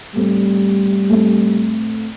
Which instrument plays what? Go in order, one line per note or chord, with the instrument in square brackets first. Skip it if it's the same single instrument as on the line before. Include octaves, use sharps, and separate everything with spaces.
[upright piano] A2 A3 C4 [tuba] G3
[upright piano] A2 A3 C4